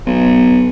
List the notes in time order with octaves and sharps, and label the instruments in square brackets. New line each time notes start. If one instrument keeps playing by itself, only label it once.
[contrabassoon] B1